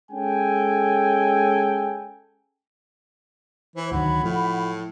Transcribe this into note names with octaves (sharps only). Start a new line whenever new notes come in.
G#3 C#4 A4 G5 G#5
E3 C5
D2 D#3 F#3 F#5 B5
A2 F3